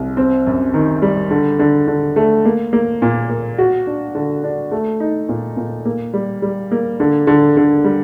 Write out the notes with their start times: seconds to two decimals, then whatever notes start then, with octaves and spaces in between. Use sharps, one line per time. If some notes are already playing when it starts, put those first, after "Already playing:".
Already playing: C2
0.17 C4
0.47 F#2
0.74 D#3
1.02 G3
1.31 D3
1.59 D3
1.87 D3
2.16 A3
2.45 A#3
2.73 A#3
3.02 A#2
3.29 A#3
3.58 F#4
3.87 D4
4.15 D3
4.44 D4
4.71 A3
5.00 D#4
5.29 A#2
5.57 A#2
5.85 A#3
6.13 G3
6.42 G3
6.72 A#3
7.00 D3
7.27 D3
7.57 D3
7.84 G3